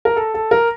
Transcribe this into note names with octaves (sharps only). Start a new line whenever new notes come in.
A#4
A4
A4
A#4